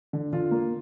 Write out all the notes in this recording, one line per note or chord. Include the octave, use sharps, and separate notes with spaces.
D3
D3 F4
A#3